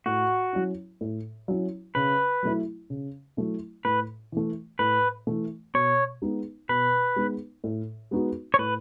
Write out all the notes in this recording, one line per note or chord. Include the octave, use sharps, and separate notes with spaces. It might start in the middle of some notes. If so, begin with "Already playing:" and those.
A2 F#4
F#3 C#4 E4
A2
F#3 C#4 E4
C#3 B4
F#3 A3 E4
C#3
F#3 A3 E4
A2 B4
E3 A3
A2 B4
E3 A3
B2 C#5
G#3 B3 D#4
B2 B4
G#3 B3 D#4
A2
G#3 B3 D#4 F#4
C#5
A2 B4